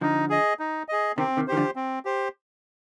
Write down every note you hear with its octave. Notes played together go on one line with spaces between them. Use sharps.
D3 F3 D#4
G#4 D#5
D#4
G#4 D#5
C3 D#3 C4
C3 D#3
D#3 G4 C5
D3 F3
C4
G4 C5